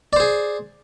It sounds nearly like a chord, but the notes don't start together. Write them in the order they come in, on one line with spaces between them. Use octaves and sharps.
D5 C5 G#4